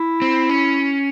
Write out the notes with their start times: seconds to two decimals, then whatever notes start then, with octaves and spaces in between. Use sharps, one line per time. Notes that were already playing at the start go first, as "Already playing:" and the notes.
Already playing: E4
0.22 C4
0.49 C#4